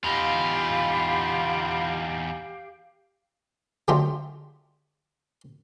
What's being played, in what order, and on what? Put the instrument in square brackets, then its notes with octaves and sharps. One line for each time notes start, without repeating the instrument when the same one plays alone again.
[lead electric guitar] E2 D#4 [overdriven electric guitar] F4 [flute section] G4 F5 [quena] B5
[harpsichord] D3 F#3 G#3 A3 F4 G4